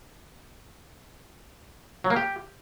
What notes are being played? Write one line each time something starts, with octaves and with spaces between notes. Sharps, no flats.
F#3
A#3
G4